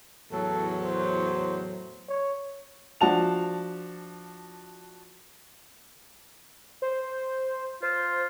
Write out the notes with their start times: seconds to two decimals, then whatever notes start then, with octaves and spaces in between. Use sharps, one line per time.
0.32 E2 A2 F#3 A4
0.83 C5
2.08 C#5
3.01 F3 D4 F#4 A5 F7
6.82 C5
7.83 F4 C5